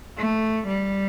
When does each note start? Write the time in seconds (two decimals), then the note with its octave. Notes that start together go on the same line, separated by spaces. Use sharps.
0.17 A3
0.67 G3